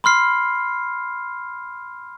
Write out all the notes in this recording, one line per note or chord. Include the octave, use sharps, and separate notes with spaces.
B5 C6 F6 C7